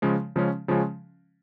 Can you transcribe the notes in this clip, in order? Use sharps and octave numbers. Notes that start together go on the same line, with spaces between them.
C#3 F3 G#3 C#4
C#3 F3 G#3 C#4
C#3 F3 G#3 C#4